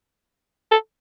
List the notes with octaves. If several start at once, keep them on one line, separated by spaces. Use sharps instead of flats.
A4